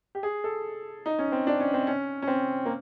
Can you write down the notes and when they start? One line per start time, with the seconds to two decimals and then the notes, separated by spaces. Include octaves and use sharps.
0.15 G4
0.23 G#4
0.44 A4
1.06 D#4
1.19 C#4
1.32 C4
1.47 D4
1.60 C#4
1.74 C4
1.87 C#4
2.22 C#4
2.28 C4
2.66 A#3